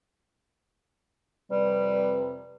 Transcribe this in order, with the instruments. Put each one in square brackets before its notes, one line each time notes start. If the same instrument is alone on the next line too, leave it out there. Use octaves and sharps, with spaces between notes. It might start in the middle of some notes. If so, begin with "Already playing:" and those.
[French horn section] F2 C3 B4 [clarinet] G3